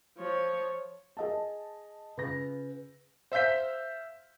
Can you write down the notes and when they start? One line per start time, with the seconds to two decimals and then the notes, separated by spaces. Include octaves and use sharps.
0.17 F3 C#5
1.17 G#4 D#5 A5
2.17 C#3 F4 B4 A#6
3.32 C5 E5 F5 G6 B6